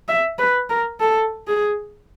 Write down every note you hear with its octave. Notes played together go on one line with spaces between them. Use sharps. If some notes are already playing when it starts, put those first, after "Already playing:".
E5
B4
A#4
A4
G#4